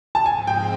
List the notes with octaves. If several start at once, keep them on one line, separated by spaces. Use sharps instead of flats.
A5
G#2 F3 G#3 C4 G#5
G5